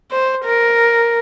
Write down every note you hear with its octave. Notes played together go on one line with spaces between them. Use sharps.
C5
A#4